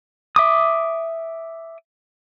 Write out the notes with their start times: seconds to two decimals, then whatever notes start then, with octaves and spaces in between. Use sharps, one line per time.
0.36 E5 D6 D#6